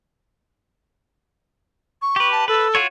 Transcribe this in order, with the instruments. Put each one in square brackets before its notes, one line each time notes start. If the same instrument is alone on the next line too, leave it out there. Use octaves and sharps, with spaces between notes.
[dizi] C#6
[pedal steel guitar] G4 B4
[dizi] A5
[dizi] A4 [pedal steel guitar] B4
[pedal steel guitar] F4 F#4 C#5